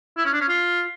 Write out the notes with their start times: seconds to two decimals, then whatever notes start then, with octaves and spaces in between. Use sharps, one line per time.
0.17 E4
0.25 C#4
0.33 D4
0.41 C#4
0.49 F4